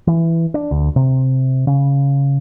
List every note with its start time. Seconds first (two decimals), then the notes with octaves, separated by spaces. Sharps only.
0.07 E3
0.54 D4
0.71 D2
0.96 C3
1.67 C#3